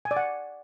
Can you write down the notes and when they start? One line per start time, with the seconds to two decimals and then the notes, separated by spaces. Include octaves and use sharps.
0.05 G#5
0.11 D5
0.17 F#5